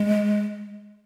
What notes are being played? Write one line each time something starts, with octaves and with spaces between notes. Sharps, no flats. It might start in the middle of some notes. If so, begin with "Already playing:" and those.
Already playing: G#3